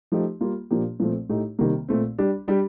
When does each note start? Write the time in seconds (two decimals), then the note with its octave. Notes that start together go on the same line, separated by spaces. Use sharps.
0.12 F3 A3 D#4 G4
0.41 G3 A#3 F4
0.71 A#2 F3 A#3 D4 G4
1.00 A#2 F3 A3 C4
1.29 A2 A3 D#4 G4
1.59 C3 D#3 G3 A#3
1.88 A#2 A3 C4
2.18 G3 D4 G4
2.48 G3 D4 G4